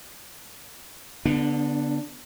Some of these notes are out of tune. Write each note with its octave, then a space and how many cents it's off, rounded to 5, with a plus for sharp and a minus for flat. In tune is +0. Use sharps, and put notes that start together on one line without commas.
D3 -25 B3 +0 D4 +15